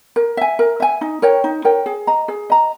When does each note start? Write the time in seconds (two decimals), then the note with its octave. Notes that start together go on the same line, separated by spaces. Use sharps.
0.16 A#4
0.37 E5 G#5
0.59 A#4
0.80 E5 G#5
1.01 D#4
1.22 A#4 C#5 G5
1.44 D#4
1.65 A#4 C#5 G5
1.86 G#4
2.07 D#5 A#5
2.28 G#4
2.50 D#5 A#5